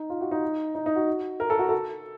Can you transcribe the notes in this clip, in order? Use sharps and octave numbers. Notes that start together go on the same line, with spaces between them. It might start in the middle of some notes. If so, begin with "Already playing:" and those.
Already playing: D#4
F4
F#4
D#4
D#4
D#4
F#4
A#4
A4
F#4
A4